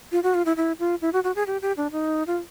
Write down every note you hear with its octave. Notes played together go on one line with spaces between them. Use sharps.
F4
F#4
F4
E4
E4
F4
E4
F#4
F#4
G#4
G4
G4
D4
D#4
F4